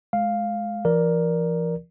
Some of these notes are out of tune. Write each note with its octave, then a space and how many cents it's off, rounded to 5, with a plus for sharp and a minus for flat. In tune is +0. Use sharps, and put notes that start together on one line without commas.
G#3 +25 F5 +0
E3 +40 A#4 +10 D5 +0